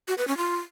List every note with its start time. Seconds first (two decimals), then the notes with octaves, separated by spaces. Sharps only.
0.08 F#4
0.18 B4
0.28 C#4
0.37 F4